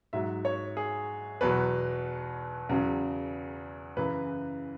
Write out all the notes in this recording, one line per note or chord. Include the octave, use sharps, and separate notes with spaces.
G#2 F#3 E5
C#5
G#4
E2 B2 F#3 B4
E2 C#3 F#3
F#2 C#3 E3 B4